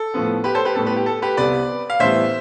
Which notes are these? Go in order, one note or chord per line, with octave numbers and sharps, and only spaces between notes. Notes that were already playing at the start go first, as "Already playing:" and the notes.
Already playing: A4
A2 F3 B3
G4 B4
A4 C5
G4 B4
A2 G3 B3 A4
G4 B4
G4
A4
G4 B4
C2 C3 G3 B3 B4 D5
F5
A2 E3 G3 B3 C5 E5